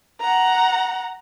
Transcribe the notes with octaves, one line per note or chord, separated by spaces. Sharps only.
F#5 A#5